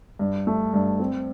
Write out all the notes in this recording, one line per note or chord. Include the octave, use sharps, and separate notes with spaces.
G2
A3
G2
C4